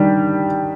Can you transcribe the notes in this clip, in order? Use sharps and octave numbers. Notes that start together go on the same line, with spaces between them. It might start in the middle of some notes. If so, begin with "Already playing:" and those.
Already playing: D#3 G3 D4